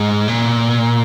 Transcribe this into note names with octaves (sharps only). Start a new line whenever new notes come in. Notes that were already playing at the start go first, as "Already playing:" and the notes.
Already playing: G#2
A#2